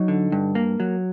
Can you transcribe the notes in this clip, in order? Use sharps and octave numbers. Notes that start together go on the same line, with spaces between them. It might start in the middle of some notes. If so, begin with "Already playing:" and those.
Already playing: F#3 D#4
D3
G2
A#3
F#3